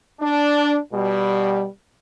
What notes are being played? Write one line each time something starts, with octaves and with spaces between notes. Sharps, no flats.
D4
B2 G3